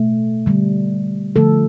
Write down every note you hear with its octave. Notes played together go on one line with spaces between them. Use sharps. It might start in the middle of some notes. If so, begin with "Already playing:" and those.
Already playing: B2 A3
D3 G3
D3 F3 A3 A4